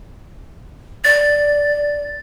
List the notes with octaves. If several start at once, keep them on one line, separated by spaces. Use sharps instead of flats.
D5 A6